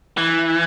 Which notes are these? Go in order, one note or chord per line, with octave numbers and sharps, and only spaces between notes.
E3